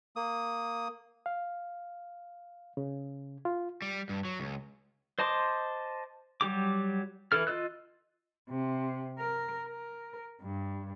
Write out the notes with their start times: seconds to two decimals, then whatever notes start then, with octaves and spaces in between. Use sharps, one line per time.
0.16 A#3 D#6
1.26 F5
2.77 C#3
3.45 F4
3.82 G3
4.09 G2
4.25 F#3
4.40 C#2
5.19 C5 D#5 A5 C6 D6
6.41 F#3 G3 G4 D6
7.32 E3 E4 A4 F6
7.47 F4 D#5 E6 F#6
8.49 C3
9.19 A#4
9.66 A#4
10.41 G2